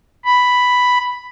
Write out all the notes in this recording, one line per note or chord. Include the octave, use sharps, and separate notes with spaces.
B5